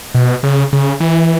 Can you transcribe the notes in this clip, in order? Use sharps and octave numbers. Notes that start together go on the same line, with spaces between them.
B2
C#3
C#3
E3